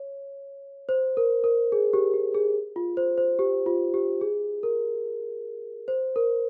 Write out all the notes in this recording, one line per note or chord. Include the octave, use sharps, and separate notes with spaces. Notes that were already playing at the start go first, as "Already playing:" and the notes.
Already playing: C#5
C5
A#4
A#4
G#4
G4
G4
G#4
F4
C5
C5
G4
F4
G4
G#4
A#4
C5
A#4